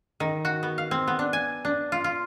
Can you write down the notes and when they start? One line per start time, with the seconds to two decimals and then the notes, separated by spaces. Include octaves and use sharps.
0.20 D#3
0.45 F#4
0.63 B3
0.78 F5
0.91 C4
1.07 B3
1.19 D4
1.33 G#5
1.65 D4
1.92 F4
2.04 F4